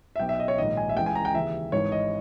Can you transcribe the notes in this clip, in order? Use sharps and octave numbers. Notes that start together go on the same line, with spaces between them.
E5
B1 B2 G5
E5
D#5
C#5
A#1 G#2 D#3 D#5
G#5
E5
C#2 C#3 E3 G5
G#5
A#5
G5
D#2 C#3 E3 E5
G#1 G#2 E3 C#5
D#5